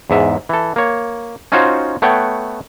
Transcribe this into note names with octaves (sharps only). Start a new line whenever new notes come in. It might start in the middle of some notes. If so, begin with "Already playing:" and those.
E2 G#2 E5
E3 A4
A#3 C#5
C#4 D#4 F4 F#4 C5 C#5
A3 B3 C#5 F#5 G5